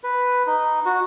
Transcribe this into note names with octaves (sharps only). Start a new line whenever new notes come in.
B4
D#4
F#4